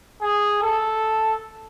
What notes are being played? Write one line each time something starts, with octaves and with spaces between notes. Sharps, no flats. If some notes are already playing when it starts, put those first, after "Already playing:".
G#4
A4